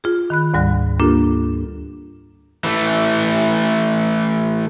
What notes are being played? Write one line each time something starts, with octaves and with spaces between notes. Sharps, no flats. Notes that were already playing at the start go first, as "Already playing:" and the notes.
F4 G#4
D#3 B5 F#6
D2 G#2 G3 D5 F#6
A#3 D4 F4 G4 A4 A#4
E3 A3